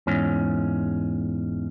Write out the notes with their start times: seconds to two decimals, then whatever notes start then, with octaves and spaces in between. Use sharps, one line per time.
0.07 E2 G#2 C#4